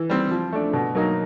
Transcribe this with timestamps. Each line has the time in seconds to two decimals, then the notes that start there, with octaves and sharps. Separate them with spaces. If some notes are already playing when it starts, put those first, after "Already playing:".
Already playing: E3
0.10 G3 C4
0.31 F3
0.53 A3 D4
0.73 B2
0.95 F#3 A#3 D#4